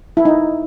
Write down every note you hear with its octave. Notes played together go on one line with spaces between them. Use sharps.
E4
D#4